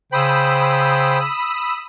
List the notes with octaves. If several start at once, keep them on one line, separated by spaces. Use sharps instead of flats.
C#3 C5 G5 B5 D#6 E6